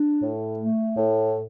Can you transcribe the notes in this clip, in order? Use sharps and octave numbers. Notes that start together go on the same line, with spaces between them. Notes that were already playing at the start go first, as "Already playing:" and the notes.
Already playing: D4
A2
A3
A2